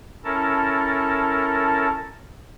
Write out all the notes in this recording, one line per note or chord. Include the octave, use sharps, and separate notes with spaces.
C#4 E4 A4 A#4 A5